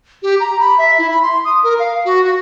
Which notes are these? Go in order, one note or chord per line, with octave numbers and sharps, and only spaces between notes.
G4
A#5
B5
E5
E4
B5
C6
D#6
A#4
F5
F#4
F#4